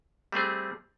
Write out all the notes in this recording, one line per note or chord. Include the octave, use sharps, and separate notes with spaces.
G3 A3 C4 G#4